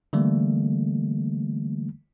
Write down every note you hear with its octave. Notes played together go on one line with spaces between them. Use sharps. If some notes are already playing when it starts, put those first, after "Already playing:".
D3 E3 G3 A3 A#3